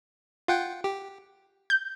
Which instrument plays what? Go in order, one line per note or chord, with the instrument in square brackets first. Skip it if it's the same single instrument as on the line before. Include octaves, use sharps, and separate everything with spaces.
[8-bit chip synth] F4 F#5 G5
G4
[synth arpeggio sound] G6